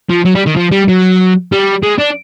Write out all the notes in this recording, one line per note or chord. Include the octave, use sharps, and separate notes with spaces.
F3
F#3
G3
D#3
F3
G3
F#3
G3
G#3
D4